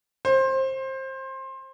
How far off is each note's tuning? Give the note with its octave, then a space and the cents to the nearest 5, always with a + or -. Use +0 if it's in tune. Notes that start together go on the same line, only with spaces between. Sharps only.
C5 +20